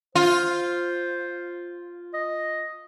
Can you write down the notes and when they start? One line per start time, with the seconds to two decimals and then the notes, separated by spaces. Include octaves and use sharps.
0.15 F4 C5
2.14 D#5